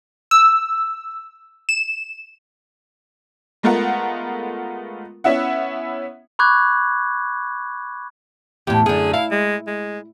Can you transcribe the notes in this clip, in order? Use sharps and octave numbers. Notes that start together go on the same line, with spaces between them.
E6
E7
G#3 A3 B3 F4 A#4 F#5
B3 C#4 E4 E5 F#5
B5 C#6 D6 F#6 G#6
E2 A2 G4
F#2 D3 G#4
E4 F5
G#3
G#3